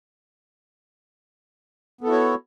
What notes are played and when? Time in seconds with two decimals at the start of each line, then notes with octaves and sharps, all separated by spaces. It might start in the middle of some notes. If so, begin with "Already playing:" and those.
2.01 B3
2.04 A4
2.06 E4
2.09 F#4
2.12 C#5